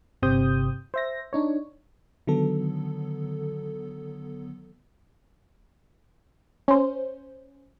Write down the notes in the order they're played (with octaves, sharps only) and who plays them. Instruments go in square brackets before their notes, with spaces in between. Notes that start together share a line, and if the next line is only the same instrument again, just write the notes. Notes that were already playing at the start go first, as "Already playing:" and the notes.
[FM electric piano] G1 C3 G4 C5 D#6 G6
C5 E5 A#6
D4 D#4 C#5
D3 D#3 F#3 B3 A4
[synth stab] C#4 C5